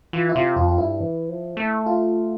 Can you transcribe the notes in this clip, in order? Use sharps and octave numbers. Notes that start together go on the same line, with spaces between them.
E3 F4
E4
C3 F4
F2 F4
F4
G2 E4
E3
F3
A3
F4